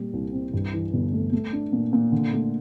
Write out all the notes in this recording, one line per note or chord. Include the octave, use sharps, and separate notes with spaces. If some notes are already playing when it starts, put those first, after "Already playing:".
Already playing: A#2 G3
C2
C4
G2
E3
G1
A3
A3
D4
A#2
A#2
D3
A3